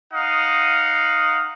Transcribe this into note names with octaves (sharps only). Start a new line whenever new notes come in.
D#4 F5 F#5 D#6